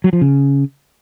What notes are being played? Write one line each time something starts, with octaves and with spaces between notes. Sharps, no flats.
F#3
F3
C#3